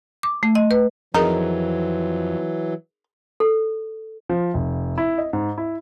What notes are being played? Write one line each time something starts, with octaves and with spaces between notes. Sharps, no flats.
D6
A3
D#5
B4
F2 E3 F#3 D#4 G#4 A#4
A4
F3
F1
E4
D#5
G#2
E4